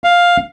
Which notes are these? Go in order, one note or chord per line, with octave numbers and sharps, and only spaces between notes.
F5